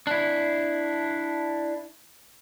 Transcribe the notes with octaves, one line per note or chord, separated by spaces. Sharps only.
D4 E4